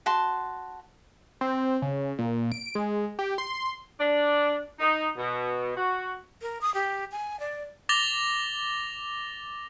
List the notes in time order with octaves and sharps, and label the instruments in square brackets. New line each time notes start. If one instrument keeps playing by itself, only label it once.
[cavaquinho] F#4 A5 C6
[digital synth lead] C4
C#3
A#2
D7
G#3
G4
C6
[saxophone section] D4
D#4
B2
F#4
[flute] A#4
D#6
G4
G#5
D5
[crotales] D6 A6 A#6 F7 G7